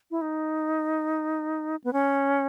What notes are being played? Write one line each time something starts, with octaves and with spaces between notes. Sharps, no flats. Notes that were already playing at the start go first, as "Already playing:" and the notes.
E4
D#4
B3
C#4